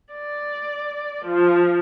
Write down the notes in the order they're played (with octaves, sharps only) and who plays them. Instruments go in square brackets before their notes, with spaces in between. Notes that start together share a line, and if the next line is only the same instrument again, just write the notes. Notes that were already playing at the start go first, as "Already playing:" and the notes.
[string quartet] D5
F3